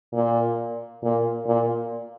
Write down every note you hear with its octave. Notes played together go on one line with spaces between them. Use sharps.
A#2
A#2
A#2